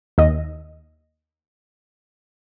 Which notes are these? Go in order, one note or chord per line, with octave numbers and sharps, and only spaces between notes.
D#2 D#5